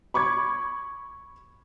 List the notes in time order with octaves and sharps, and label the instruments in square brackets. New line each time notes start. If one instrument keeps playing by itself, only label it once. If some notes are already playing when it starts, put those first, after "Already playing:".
[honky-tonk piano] B5 C#6 D6 G#6